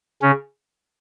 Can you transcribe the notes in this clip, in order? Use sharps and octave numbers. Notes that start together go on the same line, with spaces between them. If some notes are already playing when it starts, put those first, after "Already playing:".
C#3 C#4